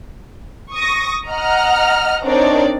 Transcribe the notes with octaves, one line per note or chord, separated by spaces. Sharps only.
C#6 D#6 A#6
D#5 F#5 A#5 F6
C4 D4 D#4 A#4 C#5 D5